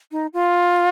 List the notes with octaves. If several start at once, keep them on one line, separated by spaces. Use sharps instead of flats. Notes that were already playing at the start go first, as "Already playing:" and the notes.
D#4
F4